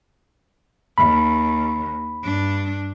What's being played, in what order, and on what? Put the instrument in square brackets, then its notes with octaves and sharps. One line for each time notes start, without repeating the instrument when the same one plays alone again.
[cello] D#2 [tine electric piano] B5
[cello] G2 D4